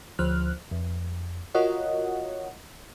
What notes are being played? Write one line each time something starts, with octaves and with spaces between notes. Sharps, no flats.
D2 F3 C5 F6 F#6
F2
F4 F#4 A#4 C#5 D#5 F#5